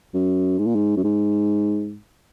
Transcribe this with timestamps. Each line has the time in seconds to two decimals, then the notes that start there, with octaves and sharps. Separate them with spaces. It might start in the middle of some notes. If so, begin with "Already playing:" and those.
0.14 F#2
0.59 G#2
0.67 A#2
0.75 G#2
0.97 F#2
1.04 G#2